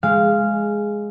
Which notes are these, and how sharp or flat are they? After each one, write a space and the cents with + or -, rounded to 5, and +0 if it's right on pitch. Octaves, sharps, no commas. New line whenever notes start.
G#3 +0 F5 -10